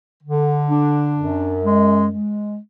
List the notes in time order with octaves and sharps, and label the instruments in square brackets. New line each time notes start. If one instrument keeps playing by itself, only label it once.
[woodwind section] D3
D4
F#2
G#3
G#3